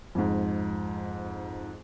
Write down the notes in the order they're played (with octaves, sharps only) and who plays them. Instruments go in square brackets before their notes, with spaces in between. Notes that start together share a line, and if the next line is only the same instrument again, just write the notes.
[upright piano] F2 G#2